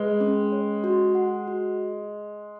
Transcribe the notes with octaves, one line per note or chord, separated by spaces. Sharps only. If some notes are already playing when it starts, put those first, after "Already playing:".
Already playing: G#3 B4
C#4
C#5
F#4
F#5
F#4